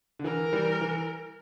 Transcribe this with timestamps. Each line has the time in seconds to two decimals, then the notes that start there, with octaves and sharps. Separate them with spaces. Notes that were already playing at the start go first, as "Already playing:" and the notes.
0.19 D3
0.24 E3 A#4
0.53 E3 G3
0.81 E3